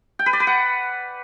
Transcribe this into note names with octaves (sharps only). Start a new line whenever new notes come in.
G5
B4
D5
B4
F#5